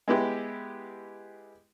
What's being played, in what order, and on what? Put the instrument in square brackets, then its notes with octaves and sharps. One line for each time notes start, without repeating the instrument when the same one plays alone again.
[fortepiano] G#3 B3 E4 G4